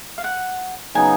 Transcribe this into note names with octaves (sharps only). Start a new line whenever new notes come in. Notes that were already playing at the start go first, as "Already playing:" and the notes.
F5
F#5
C#3 F#3 B3 D#4 G#5